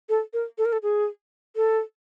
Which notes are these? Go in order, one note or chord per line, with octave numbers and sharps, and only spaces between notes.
A4
A#4
A4
A#4
A4
G#4
A4